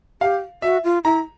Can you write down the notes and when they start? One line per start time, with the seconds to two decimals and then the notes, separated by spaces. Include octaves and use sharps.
0.21 G4 F5
0.62 F#4 E5
0.84 F4
1.04 E4 A#5